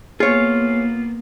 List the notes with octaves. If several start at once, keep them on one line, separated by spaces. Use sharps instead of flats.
A#3 B3 F4 G#4 C#5